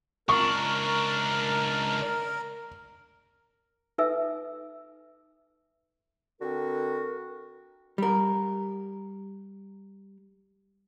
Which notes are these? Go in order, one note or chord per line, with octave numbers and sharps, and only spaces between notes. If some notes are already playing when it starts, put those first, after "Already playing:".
C#2 D4 A#4 C#6
D#4 A4 B4 E5 G#5 E6
D3 C4 F#4 A#4
G3 A#4